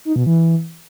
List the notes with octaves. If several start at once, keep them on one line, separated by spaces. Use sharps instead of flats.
D#4
B2
E3